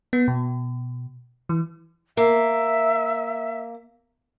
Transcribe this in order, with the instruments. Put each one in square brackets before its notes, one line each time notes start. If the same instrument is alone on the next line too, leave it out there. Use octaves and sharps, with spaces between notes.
[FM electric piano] B3
B2
E3
[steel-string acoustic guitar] A#3 [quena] E5